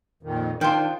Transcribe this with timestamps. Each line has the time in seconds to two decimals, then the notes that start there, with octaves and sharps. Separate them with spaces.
0.23 F2 A#2 D#3
0.61 D#3 D4 F4 C5 G5